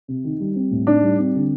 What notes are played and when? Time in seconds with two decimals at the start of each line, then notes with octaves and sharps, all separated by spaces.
0.08 C3
0.24 D#3
0.40 G3
0.56 C4
0.71 A2
0.87 D4 D#4
1.03 G3
1.19 C4
1.35 D3